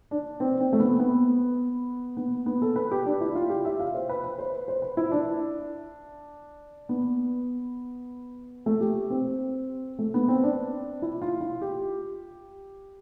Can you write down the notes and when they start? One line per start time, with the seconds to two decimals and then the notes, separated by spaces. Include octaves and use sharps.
0.11 D4
0.40 C4
0.60 C4
0.73 A3
0.80 B3
0.99 B3
2.17 B3
2.46 B3
2.62 A4
2.76 B4
2.91 G4
3.06 D4
3.21 E4
3.35 F4
3.50 G4
3.65 E5
3.80 F5
3.94 C5
4.09 B4
4.24 B4
4.39 C5
4.68 C5
4.82 B4
4.97 E4
5.12 D4
6.89 B3
8.66 A3
8.81 G4
9.10 C4
9.99 A3
10.14 B3
10.28 C4
10.43 D4
11.02 E4
11.22 F4
11.41 F4
11.62 G4